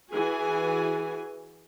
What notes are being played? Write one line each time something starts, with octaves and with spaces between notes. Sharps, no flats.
E3 F#4 G#4 G#5